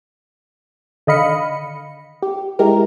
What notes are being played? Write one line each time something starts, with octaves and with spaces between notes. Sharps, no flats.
D3 D#3 D#5 F5 B5 C#7
G4
G#3 E4 G4 A#4